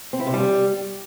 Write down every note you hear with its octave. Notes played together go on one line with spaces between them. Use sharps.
C4
E4
C3
G3